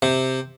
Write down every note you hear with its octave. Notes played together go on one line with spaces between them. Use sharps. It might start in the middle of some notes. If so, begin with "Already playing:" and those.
C3